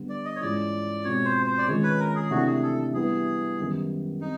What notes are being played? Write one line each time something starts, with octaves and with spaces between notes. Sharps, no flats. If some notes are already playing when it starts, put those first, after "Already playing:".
Already playing: D3 G3 B3
D5
D#5
C#5
G#2 E3 G#3 C#4 F4 D5
B2 G#3 C4 F4 C#5
C5
C5
D5
D#3 G#3 C#4 F4 C#5
B4
A#4
G#4
C3 E3 A3 D4 F#4
G#4
A4
E3 G3 B3 E4 G#4
F#2 D#3 G3 B3 D#4
C4 D#4